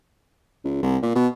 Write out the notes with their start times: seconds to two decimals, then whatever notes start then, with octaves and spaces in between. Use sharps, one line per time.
0.64 C#2
0.83 C2
1.03 A#2
1.15 B2